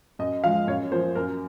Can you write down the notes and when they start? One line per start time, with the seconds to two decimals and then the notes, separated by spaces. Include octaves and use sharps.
0.19 F#2 D#5
0.43 F3 F5
0.46 G#3
0.67 F#2 C#5
0.92 F3 A#3 C5
1.16 F#2 A#4